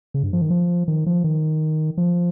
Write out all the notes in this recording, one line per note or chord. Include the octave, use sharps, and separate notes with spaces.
C#3
G2
F3
D#3
F3
D#3
F3
D#3
F3